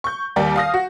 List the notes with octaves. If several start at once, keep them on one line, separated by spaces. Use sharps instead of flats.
C#6 G6
D#2 G3 A#4 D5 G5
F5 D#6 A#6
F#4